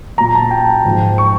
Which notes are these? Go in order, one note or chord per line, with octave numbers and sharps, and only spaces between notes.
A#2 F#3 A#5
A5
G5
G#2 F3
C#6